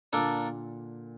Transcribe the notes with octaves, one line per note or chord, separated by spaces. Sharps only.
A#2 D3 A#3 D4 A4 D5